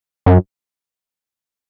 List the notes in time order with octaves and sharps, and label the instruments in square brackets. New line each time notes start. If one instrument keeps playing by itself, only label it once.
[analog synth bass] F#2